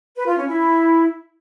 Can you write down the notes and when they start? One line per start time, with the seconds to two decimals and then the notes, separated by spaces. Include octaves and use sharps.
0.15 B4
0.26 F4
0.37 C#4
0.48 E4